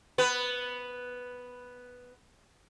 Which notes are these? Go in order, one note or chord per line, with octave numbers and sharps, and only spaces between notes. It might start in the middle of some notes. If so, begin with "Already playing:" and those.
B3 B4